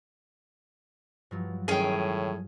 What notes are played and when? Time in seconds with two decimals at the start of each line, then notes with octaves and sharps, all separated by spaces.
1.31 G2 F3 F#3
1.68 A2 D#3 C#4 G#4 G5